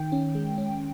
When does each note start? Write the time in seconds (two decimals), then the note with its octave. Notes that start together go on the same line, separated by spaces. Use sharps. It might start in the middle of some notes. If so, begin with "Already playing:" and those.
Already playing: D#3 G5
0.12 C#4
0.35 G#3
0.58 C#4